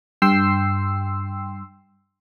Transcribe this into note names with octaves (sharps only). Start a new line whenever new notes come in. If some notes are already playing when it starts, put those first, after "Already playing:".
G2 G5 C6 E6 C7